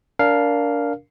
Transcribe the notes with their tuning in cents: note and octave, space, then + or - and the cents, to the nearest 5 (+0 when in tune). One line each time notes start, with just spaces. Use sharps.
D4 -25 A#4 +0 F5 +0